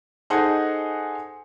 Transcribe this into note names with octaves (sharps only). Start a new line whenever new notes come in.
D#4 G#4 A4 C5 D#5 F#5